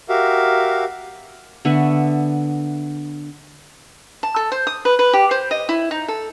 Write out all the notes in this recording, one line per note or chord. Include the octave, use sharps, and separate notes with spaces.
F#4 G4 A#4 E5 F5
D3 B3 E5 C#6
A5
A4
C5
D#6
B4
B4
G4
C5
D#5
E4
D#4
A4